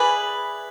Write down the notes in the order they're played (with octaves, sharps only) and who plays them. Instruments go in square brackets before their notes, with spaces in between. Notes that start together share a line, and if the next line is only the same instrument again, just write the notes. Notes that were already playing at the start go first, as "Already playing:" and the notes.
Already playing: [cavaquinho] E4 G#4 B4 D5